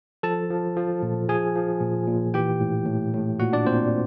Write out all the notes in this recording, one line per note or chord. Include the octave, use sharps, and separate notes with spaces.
F3 A4 A5
F3
F3
A#2
F3 G#4 G#5
F3
A#2
A#2
E3 G4 G5
A2
A2
A2
A#2 F#4 F#5
D4 D5
A#2 C4 C5